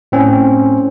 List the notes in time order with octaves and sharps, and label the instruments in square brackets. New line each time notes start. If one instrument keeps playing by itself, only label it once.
[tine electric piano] A2 C4 C#4